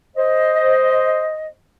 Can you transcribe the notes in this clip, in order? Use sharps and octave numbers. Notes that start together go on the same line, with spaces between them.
C5 D#5